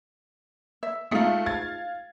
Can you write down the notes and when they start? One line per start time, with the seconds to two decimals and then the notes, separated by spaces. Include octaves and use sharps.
0.83 E5
1.11 G#3 A3 D#4 F4
1.46 F5 G#6 A6